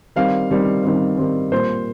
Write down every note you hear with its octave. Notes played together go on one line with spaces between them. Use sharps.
D#3 G3 C4 F5
D#3 G3 C4
D#3 G3 C4
D#3 G3 C4
A#2 G3 A#3 C5